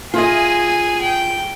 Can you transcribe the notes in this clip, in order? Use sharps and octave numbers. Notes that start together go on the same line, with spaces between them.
F4 G#4 D#5 G#5
G5